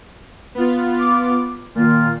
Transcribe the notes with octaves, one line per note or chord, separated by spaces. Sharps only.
B3 F4
D6
A#2 D#3 F4